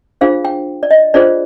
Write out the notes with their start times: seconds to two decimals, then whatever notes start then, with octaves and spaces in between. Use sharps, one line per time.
0.21 D4 F4 G#4 C5 F5
0.45 G5
0.83 D5
0.91 D#5
1.14 D4 F4 G#4 C5 D5